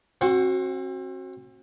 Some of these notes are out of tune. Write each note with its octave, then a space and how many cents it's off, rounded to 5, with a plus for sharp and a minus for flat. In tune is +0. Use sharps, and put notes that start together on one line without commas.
C4 +35 F#4 +0